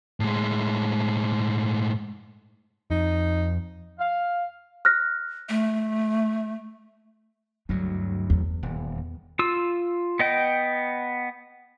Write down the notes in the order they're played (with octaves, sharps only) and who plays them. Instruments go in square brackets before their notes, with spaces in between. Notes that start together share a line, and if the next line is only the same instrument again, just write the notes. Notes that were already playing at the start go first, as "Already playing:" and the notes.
[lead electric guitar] A2 G#3
[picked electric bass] F2 [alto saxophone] D#4
[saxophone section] F5
[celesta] F6 F#6 A#6
[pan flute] A3
[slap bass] D2 F#3 [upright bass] G2
[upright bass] E2
[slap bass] D#1
[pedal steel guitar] F4 E6
B3 D#5 G5